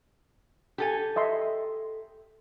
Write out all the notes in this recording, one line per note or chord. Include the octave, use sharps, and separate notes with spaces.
G4 A4 G#5
D#5 E5 C6